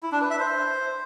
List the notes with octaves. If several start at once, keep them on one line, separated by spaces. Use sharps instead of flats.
E4
D4
B4
E5
C5